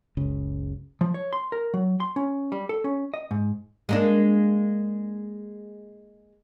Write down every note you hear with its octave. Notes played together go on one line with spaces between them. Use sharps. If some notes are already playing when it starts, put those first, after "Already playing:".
F#1 C#2 C#3
F3
C#5
C6
A#4
F#3
C6
C#4
G3
A4
C#4
D#5
G#2
G#3 A#3 D4